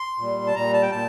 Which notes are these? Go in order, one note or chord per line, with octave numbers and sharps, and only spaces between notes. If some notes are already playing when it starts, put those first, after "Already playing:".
Already playing: C6
A#2 G3
A5
A#2 G3 A#5
A5
G5
A#2 A5